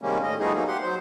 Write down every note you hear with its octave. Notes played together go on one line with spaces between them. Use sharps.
C3 D#3 G3 G#3 A#3 C#4
A2 D#5
F3 G3 A3 B3 D#4 G#4
F#3 A#3 D#4
G4 F#5 C6
F#3 C5